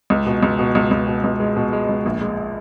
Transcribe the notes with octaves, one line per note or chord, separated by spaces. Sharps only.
C#2
B2
C#2
B2
C#2
C#2
B2
C#2
G#3
B2
G#3
C#2
A#1
G#3